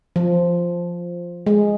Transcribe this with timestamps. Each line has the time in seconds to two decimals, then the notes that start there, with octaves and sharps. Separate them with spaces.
0.16 F3
1.46 G#3